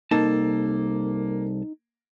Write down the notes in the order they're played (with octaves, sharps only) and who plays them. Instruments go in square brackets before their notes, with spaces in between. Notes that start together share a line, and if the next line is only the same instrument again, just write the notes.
[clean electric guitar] C2 A4 A5 [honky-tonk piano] A#3 [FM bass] D#4